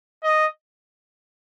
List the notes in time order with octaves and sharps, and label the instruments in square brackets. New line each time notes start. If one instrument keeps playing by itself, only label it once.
[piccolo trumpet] D#5